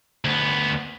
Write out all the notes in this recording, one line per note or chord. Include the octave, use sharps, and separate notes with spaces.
D2 B3